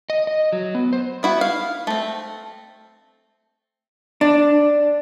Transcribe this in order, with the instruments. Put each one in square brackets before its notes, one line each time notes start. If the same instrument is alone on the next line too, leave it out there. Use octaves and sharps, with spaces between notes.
[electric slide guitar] D#5
D#5
F#3
B3
C5
[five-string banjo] B3 E4 F#4
F5
A3 C4
[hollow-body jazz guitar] D4